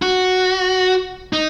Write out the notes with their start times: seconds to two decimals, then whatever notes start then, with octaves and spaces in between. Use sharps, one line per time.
0.02 F#4
1.33 D#4